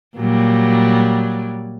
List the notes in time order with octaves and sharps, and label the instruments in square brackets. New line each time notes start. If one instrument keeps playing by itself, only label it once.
[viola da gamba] A#2 F#3 G3